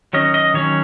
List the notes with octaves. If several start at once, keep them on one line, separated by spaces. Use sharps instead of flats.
D#3 F#3 C#4 D#5
D#5
D#3 F#3 C#4 C#5